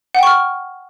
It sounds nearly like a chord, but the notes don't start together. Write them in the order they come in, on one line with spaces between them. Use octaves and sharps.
F#5 G5 C#6 F6